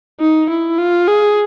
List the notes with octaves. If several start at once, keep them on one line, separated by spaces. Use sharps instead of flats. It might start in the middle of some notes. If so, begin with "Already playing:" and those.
D#4
E4
F4
G#4